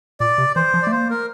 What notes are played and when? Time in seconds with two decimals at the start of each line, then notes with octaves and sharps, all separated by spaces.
0.20 A#2 D5
0.38 C3
0.56 E3 C5
0.74 F3
0.82 D5
0.87 A3
0.92 A#3 C5
1.10 A#4